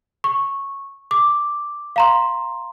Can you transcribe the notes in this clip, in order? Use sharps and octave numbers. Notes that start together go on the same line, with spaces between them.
C#6
D6
F5 A#5 C6